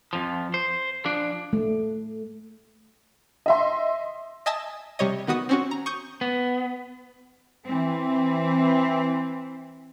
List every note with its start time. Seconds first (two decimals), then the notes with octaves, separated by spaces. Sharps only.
0.13 F2 F3
0.54 C5
1.05 F3 D4
1.53 A3
3.46 D#5 E5 C6
4.46 D#5 E5 G#5 A5 D#6 E6
4.99 C3 G3 C#5 D#5
5.27 D#3 B3 F#4 D#6
5.49 C4 C#4 F#4
5.71 A#5
5.86 C#6 D#6 G6
6.21 B3
7.66 E3 C4